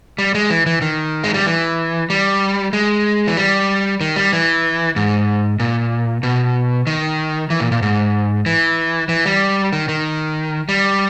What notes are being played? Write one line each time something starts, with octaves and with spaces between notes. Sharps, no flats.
G3
G#3
E3
E3
D#3
G#3
G3
E3
G3
G#3
E3
G3
D#3
G3
E3
G#2
A#2
B2
D#3
E3
A#2
A#2
G#2
E3
E3
G3
D#3
D#3
G3